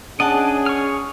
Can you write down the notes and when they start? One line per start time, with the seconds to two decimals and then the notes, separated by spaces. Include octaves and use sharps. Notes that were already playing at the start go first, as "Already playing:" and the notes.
0.20 C#4 D4 G#4 D#5 F#5 A5
0.66 C#6 F6